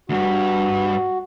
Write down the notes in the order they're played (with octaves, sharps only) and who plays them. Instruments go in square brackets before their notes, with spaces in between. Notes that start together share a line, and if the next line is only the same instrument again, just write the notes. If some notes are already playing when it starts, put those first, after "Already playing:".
[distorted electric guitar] D2 G2 [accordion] F#4